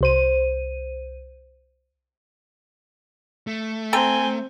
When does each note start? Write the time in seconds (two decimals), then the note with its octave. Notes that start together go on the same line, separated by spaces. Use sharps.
0.01 C2 C5 D#7
3.47 A3
3.93 C4 A4 G5 G#5 A#5